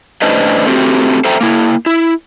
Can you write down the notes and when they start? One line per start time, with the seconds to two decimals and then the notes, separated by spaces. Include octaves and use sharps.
0.22 A2 C#4 D4 B4 C5 D#5
0.66 A3 C4 F#4 G4
1.25 A4 C5 E5 G5 A#5
1.41 A#3 E4
1.86 E4